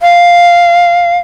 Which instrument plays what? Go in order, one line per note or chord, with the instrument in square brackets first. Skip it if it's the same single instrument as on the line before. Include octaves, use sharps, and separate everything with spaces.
[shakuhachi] F5